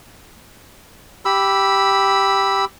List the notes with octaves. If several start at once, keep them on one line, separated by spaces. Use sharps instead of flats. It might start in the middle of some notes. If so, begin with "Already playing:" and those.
G4 B5 E6